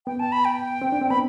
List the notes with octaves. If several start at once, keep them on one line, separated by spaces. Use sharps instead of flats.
B3 G5
A5
B5
G5
C4
D4
C4
B3 B5